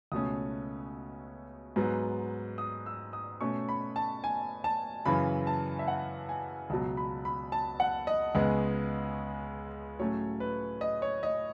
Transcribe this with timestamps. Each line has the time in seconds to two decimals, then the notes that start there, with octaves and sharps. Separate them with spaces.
0.12 C#2 B2 A3 C#4 D#6
1.76 G#2 F#3 B3
2.58 D#6
2.86 E6
3.13 D#6
3.41 B2 A3 C#4 C#6
3.69 B5
3.96 A5
4.24 G#5
4.64 A5
5.05 F#2 C#3 E3 B5
5.47 A5
5.79 E5
5.88 F#5
6.29 G#5
6.70 C#2 B2 F#3 A5
6.97 B5
7.25 B5
7.52 A5
7.80 F#5
8.07 D#5
8.35 C#2 C#3 G#3 B3
9.99 A2 F#3 A3 C#4 C#5
10.40 B4
10.81 D#5
11.02 C#5
11.23 D#5